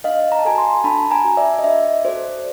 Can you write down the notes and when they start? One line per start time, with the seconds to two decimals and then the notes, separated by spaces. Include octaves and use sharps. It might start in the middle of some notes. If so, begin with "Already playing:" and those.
0.04 D4 D#5 F5
0.32 A#5
0.39 A5
0.45 F#4 A4 G#5 A#5
0.58 A#5 C6
0.84 D4 A5 B5
1.11 G#5 A#5
1.25 F#4 A4
1.37 D5 E5
1.59 D#5
1.64 D4 D5 E5
2.05 F#4 A4 C5 D5